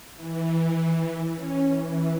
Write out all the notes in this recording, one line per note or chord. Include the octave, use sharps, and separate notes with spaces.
E3
C#4
E3